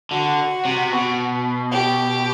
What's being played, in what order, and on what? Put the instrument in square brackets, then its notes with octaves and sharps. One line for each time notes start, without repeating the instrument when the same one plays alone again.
[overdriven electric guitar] D3 [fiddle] F#4
[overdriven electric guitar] C3
B2
[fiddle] G4